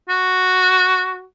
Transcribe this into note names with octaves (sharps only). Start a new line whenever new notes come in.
F#4